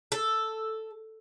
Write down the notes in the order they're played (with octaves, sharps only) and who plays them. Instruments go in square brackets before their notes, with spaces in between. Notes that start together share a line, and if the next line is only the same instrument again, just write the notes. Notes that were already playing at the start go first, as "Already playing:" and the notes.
[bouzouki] A4